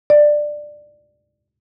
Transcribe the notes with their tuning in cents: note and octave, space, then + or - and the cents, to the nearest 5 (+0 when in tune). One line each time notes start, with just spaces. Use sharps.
D5 +15